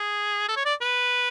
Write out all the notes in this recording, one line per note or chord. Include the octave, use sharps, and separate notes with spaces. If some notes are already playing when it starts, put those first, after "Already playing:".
Already playing: G#4
A4
C#5
D5
B4